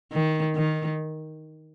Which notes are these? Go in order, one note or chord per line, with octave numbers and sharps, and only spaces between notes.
D#3
D#3